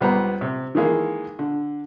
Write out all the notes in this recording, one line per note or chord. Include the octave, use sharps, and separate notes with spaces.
C#2 G3 B3 C5 A#5
C3
D#3 E3 G#3 A#3
D3